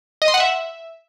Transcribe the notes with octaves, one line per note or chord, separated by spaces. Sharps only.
D#5
C6
F#5
E5